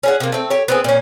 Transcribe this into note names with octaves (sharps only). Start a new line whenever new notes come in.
C#4 G#4 F#5
C3 A#3
A3 C4
G4 C#5
B3 C4 G#4
A#2 C#4